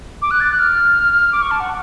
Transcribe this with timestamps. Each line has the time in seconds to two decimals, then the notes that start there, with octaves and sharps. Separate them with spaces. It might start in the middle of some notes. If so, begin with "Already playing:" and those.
0.22 D6
0.31 F#6
0.40 A6
0.50 F#6
0.59 F6
1.32 D6
1.42 C#6
1.51 A5
1.60 F#5